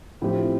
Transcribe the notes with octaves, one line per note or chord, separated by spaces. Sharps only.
A2 F3 C4 G4